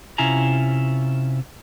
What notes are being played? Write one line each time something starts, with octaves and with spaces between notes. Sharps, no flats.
C3 C#4 E4 F4 G#5 A#5